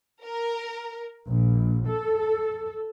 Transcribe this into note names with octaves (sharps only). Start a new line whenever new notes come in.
A#4
A#1
A4